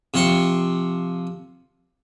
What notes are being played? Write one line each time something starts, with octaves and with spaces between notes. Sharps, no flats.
C3 F3 C6 C#6